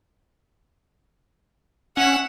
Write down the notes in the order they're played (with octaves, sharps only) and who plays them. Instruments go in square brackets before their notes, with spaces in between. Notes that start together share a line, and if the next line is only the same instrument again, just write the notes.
[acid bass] C#4 [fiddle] E5 F#5